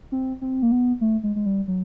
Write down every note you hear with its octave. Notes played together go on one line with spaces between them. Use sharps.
C4
C4
A#3
B3
A3
G#3
G#3
G3
F#3